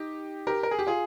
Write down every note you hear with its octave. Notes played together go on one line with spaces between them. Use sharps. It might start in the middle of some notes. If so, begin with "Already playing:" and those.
Already playing: D#4 G4
G4 A#4
A#4
G#4
G4
F4 G#4